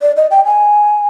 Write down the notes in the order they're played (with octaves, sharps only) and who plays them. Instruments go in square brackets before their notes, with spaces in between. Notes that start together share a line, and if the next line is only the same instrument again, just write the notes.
[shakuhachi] D5
D#5
G5
G#5